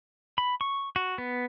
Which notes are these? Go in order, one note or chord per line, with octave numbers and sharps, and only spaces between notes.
B5
C#6
F#4
B3